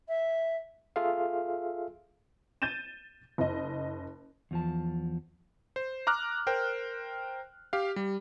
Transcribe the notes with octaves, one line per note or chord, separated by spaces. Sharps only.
E5
F4 G#4 A4 E5 F5
G6 A6 D#7 E7
F#1 D#5
E2 F3 A5
C5
A#5 D6 F6 F#6
A#4 C5 G5
G4 F5
G3